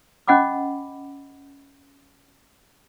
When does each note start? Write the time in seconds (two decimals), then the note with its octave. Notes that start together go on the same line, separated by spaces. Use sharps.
0.28 C#4 D#5 F#5 B5 D6